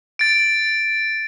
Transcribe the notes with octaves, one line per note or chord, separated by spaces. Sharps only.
A6 D7